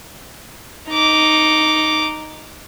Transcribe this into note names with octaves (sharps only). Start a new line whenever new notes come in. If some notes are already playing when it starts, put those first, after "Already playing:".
D#4 D6